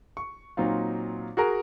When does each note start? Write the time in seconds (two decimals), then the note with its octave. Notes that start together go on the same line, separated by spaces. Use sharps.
0.17 C#6
0.57 A#2 F#3 C4 D#4 F4
1.37 F#4 G#4 A#4 A#5